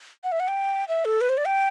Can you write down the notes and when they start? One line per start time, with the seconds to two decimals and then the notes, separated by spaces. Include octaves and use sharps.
0.24 F#5
0.32 E5
0.40 F#5
0.48 G5
0.88 E5
1.05 A4
1.21 B4
1.29 C5
1.37 D5
1.45 G5